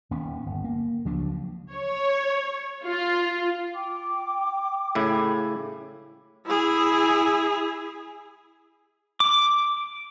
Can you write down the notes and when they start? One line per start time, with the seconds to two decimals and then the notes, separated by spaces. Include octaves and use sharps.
0.11 D#1 D#2 B3 C#4
0.46 G1
0.64 A#3
1.05 C#2 F3 F#3 D4
1.72 C#5
2.85 F4
3.74 G5 D6
4.95 A2 C#3 E4
6.46 E4 G#4
9.20 D6